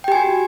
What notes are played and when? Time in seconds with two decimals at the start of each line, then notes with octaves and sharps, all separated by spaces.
0.04 G5
0.08 G4
0.12 G#5
0.15 F#4